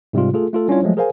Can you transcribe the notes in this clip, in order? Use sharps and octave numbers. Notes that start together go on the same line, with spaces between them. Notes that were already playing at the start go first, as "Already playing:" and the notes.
G#2 C3 G3 G#3 F4
A3 F4 G#4 A4
A3 F4 A4
G3 C#4 D4 E4 F4 C#5
F3 F#3 G#3 A3
G#4 A#4 C5 F5 G#5